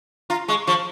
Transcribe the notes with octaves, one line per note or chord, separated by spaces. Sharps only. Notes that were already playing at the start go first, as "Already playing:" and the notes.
F4 A#5
G#3 C#6
F3 C#6